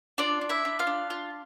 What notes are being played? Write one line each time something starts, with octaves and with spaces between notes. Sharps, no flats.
D4 F4 D5
D4
E4 E5
D4
F4 F5
D4
F4